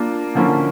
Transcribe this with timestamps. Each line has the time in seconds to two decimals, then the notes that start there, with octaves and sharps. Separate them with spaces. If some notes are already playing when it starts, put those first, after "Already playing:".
Already playing: A#3 D4 F4 A#4
0.35 D3 F3 A#3 C#4 E4